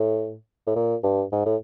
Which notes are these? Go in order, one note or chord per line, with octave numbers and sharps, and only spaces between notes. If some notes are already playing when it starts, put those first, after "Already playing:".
Already playing: A2
A2
A#2
G2
G#2
A2